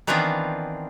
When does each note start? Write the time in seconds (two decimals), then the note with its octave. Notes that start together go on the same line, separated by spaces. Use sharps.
0.07 D#3 E3 B3 C4 D4 F4